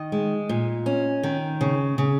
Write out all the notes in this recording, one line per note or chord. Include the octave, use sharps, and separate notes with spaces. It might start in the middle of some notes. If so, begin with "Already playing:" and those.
Already playing: D#3 D#5
G#3
A#2
C#4
D#3
C#3
C#3